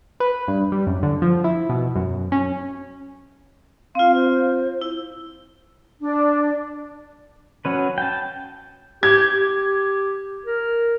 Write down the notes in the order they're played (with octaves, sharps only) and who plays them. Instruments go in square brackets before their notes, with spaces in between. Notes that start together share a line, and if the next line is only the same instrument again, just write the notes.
[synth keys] B4
G2
G3
F#2
D3
F3
E4
B2
F#2
C#4
[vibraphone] C4 F4 [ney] F5
[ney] C5
[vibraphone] E4
[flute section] D4
[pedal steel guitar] F#3 C#4 B4
G5 A5
[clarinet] G4 [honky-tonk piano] G#6
[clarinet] G4
A#4